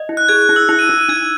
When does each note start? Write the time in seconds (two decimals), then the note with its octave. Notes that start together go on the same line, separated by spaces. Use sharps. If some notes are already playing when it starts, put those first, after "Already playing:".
Already playing: D#5
0.09 E4
0.17 F#6
0.29 G#4 G#6
0.42 F#6
0.49 E4
0.56 E6
0.69 E4 F#6
0.79 D#7
0.89 E4
0.99 D#7
1.09 D#4 G#6